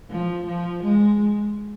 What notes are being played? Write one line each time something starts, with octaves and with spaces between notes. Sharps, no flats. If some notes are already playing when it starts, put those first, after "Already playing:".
F3
F3
G#3